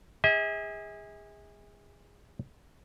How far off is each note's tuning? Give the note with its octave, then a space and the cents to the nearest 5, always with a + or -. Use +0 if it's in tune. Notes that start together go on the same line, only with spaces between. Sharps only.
G#4 -25 E5 -45